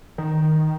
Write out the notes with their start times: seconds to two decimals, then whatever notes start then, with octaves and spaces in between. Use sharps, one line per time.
0.18 D#3